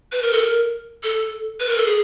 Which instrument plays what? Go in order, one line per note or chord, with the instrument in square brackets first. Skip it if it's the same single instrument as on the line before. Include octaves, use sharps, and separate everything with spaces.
[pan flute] B4
A#4
A4
A#4
A4
B4
A#4
A4
G#4